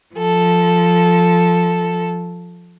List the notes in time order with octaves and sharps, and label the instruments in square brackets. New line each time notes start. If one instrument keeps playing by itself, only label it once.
[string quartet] F3 A4